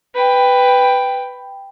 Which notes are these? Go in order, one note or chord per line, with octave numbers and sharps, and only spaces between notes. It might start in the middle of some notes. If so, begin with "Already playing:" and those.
B4 G5